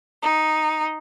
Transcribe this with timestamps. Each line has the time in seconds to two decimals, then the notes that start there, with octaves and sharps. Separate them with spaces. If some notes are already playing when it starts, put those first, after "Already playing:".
0.23 D#4